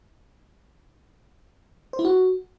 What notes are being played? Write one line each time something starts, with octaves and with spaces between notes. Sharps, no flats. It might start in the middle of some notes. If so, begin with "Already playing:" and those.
C5
E4
F#4